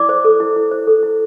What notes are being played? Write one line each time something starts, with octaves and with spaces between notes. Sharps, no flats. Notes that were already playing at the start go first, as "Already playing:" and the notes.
Already playing: E4 D5 D6
C5
A4
E4
E4
C5
A4
E4